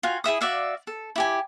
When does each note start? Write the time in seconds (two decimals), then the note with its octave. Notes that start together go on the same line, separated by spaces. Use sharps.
0.03 F4 F#4 F5 G#5
0.24 E4 G#4 E5 D#6
0.41 F#4 D5 E5 F5
0.87 A4
1.16 E4 G4 G#5